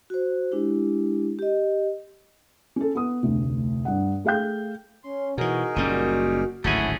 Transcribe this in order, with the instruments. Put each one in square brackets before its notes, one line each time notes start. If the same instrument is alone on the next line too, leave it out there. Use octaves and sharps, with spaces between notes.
[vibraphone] F#4 C5
G#3 D4 E4 G4
G4 D#5
[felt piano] C#4 A4
B3 D#6
F1 D2
G2 F#5
A3 G#4 F5 G5 G6
[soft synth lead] C#4 [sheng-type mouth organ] C6
[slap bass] B2 E3 [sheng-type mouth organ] D#4 G#4 A#4 [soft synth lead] F#4
[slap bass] F#1 A#3 C#4 [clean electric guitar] A#2 G3
[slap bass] D1 G#1 D2 [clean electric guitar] A3 C#4 G#4 [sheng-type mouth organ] E4 F#4